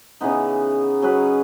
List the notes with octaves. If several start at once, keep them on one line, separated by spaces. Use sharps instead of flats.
C#3 E3 B3 D#4
F#3 C#4 G#4 B4